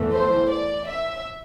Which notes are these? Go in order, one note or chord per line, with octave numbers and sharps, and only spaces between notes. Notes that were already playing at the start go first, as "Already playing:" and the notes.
Already playing: E2 E3 A3
C5
D5
E5